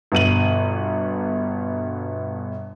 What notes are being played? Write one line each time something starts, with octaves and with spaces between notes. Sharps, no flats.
G1 B2 D#7 F#7